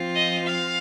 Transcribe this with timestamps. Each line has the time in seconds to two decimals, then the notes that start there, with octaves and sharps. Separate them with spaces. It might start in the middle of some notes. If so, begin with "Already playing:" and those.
Already playing: F3 C4 F4
0.15 D#5
0.46 F5